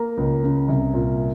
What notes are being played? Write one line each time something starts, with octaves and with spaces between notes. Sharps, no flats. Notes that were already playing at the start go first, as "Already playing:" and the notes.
Already playing: A#3 A#5
C#2
C#3
C2
A#2